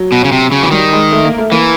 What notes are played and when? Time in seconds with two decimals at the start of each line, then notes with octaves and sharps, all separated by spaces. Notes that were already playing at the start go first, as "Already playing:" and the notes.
Already playing: F#3
0.12 B2
0.24 C#3
0.32 C3
0.52 C#3
0.63 E3
0.71 D#3 G3
0.92 G#3
1.12 A3
1.24 A#3
1.38 A3
1.52 E3 A#3